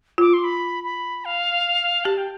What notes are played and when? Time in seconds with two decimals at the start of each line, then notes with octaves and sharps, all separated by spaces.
0.18 F4 D6
0.33 C6
0.44 B5
0.84 B5
1.25 F5
2.05 G4 A5
2.18 G5